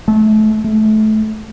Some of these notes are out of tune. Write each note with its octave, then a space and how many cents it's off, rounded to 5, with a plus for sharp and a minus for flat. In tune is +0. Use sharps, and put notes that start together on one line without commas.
A3 -30
A3 -25